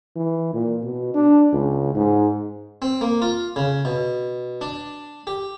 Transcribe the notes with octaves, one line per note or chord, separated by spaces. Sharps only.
E3
A#2
B2
D4
C#2
G#2
C4
A#3
F4
C#3
B2
D4
G4